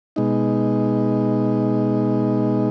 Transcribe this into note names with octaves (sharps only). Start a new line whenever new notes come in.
B2 G#3 D#4